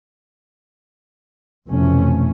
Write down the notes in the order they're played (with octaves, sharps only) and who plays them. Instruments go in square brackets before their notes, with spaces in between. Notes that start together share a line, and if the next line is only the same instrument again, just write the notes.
[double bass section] F1 F2 B2 E3 A3 C#4